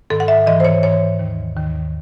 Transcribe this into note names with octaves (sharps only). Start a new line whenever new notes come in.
G#2 D#3 A4
F#5
E5
G#2 E3 D#5
C5
C#5
G#2 E3 C#5
D#2 D#3
D#2 D#3